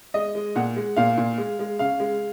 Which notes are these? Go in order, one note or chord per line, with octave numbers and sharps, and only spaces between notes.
G#3 D#5
G#3
A#2 F#5
G#3
A#2 F5
A#2
G#3
G#3
C#3 F5
G#3